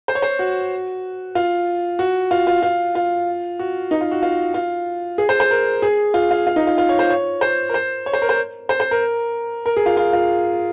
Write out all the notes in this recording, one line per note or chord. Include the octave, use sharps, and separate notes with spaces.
C5
C#5
C5
F#4
F4
F#4
F4
F4
F4
F4
F#4
D#4
F4
F#4
F4
F4
G#4
C5
C5
A#4
G#4
F4
F4
F4
D#4
F4
F4
C#5
C5
C#5
C5
A#4
C5
C#5
C5
A#4
C5
C5
C5
A#4
A#4
G#4
F4
F4
F4